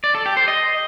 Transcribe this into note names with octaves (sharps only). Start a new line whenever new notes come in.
D5
A4
G4
C5
D#5